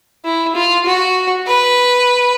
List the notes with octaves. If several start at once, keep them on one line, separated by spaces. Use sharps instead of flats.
E4
F4
F#4
B4